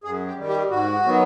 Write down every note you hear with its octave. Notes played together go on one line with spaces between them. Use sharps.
F#2 G#4
G4
D#3 G3
G4
G#2 F#4
D#3 F#3 B3